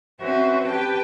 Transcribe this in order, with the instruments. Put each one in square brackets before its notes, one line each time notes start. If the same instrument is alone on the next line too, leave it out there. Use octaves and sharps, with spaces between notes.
[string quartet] C4 C#4 F#4 B4 C5 E5
G4 B4 G5 A5